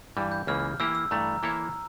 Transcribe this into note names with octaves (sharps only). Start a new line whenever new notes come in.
G2 E3 G3
G6
C#2 C#3 E3 A#3 F6
E3 A#3 E4 G4 E6
E6
G2 E3 A3 A#5
E3 A#3 E4 A4 C#5